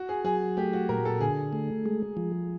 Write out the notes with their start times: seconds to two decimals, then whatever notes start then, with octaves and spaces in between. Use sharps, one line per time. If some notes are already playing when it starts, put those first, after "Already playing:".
Already playing: F#4
0.09 G#4
0.25 F#3 G#4
0.57 A3 G4
0.73 F#4
0.89 A#2 A#4
1.05 A4
1.21 D3 G#4
1.53 A3
1.86 G#3
2.17 F3